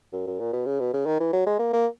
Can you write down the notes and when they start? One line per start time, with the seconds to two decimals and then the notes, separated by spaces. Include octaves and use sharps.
0.13 F#2
0.27 F#2
0.40 A#2
0.53 B2
0.66 C#3
0.80 B2
0.93 C#3
1.06 D#3
1.20 E3
1.33 F#3
1.46 G#3
1.59 A#3
1.73 A#3